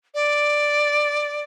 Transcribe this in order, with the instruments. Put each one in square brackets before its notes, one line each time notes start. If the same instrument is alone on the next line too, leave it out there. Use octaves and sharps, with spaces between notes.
[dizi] D5